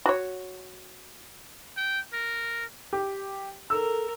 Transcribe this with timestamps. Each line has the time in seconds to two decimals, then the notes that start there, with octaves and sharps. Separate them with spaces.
0.06 F#4 C#5
1.77 G5
2.13 A#4
2.93 G4
3.70 A4 A#4 E6